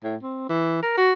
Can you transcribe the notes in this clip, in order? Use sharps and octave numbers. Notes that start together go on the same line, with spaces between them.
A2
C4
E3
A#4
F#4